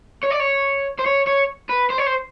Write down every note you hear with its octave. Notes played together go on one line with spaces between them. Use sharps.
C#5
D5
C#5
C5
C#5
C#5
B4
C5
C#5
C5